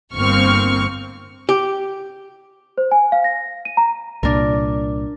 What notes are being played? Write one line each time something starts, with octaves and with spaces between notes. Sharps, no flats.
G1 A#3 C4 C#6 F6
G4
C5
G#5
F5
A#6
D#7
A#5
C2 A#2 D4 A#4